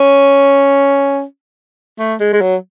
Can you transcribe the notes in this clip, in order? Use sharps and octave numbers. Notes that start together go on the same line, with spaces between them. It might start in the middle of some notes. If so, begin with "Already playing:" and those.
Already playing: C#4
A3
G#3
G#3
F#3